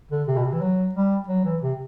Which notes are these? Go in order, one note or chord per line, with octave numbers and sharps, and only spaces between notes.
D3
C3
B2
C3
E3
F#3
G3
F#3
E3
C3